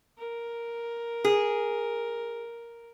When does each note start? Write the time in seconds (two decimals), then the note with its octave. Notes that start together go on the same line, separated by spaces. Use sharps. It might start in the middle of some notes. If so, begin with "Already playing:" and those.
0.18 A#4
1.24 G#4